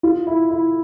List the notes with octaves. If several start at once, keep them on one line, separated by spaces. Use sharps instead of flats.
F4
E4
E4